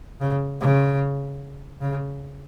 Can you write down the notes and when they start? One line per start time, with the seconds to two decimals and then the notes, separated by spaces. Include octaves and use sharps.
0.20 C#3
0.61 C#3
1.81 C#3